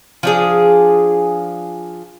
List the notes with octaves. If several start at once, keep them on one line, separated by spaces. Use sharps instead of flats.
F3 D4 G#4